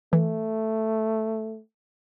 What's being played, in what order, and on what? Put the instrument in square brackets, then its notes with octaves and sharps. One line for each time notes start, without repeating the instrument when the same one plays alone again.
[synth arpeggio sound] E3 [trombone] A3